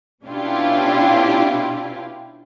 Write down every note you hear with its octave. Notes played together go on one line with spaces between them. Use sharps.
B2 C#4 D4 E4 F4 G4